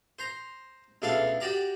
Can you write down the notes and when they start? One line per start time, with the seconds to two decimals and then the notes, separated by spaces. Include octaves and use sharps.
0.19 C5 A#5
1.02 C#2 B2 A3 D4 A4 F5
1.40 F#4 G4 D5 A#5